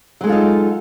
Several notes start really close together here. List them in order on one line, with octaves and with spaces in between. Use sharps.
F#3 G#3 A4 F4 D#4